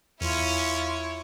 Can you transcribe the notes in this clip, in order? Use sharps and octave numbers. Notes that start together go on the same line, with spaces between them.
E2 C#4 E4 F4 C#5